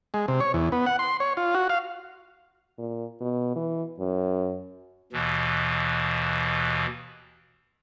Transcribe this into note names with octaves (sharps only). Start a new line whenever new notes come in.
G#3
C3
C#5
E2
B3
F#5
C6
C#5
F4
F#4
F5
A#2
B2
E3
F#2
D#2 B2 E3